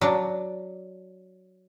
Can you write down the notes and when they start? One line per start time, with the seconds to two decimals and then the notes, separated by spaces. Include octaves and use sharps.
0.01 F#3 D4